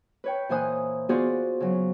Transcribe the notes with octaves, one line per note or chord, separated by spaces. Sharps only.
B4 C#5 G5
A#2 E3 C5 G#5 D#6 F#6
B3 F4 F#4 G#4 C5 D5
C#3 F#3